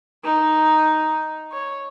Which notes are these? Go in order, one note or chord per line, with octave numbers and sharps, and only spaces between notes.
D#4
C#5